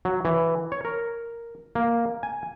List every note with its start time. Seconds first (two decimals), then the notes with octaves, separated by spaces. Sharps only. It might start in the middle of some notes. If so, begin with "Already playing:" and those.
0.05 F#3
0.25 E3
0.72 C#5
0.85 A#4
1.75 A#3
2.23 G#5